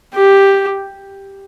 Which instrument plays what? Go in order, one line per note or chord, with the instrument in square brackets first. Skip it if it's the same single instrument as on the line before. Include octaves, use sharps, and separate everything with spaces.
[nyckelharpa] G4